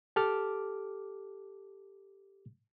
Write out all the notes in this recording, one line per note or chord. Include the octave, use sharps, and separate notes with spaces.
G4 A4 A5 D6 F6